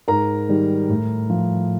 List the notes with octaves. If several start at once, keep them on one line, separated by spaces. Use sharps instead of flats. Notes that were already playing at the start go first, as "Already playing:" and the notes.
G#2 A#4 A#5
D#3 G3
A2
F3